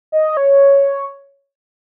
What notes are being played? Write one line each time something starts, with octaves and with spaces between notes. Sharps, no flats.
D#5
C#5